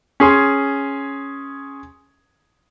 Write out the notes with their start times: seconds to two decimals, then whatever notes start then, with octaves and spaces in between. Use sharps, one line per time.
0.20 C#4 G#4 C6